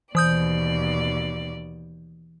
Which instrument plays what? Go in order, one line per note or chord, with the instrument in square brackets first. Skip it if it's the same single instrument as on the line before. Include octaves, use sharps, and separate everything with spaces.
[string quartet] D#2 B2 D5 [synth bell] E3 D#6 G6